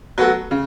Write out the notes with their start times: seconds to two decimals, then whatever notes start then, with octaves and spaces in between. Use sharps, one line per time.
0.18 F#3 B3 F#4 A4
0.51 C#3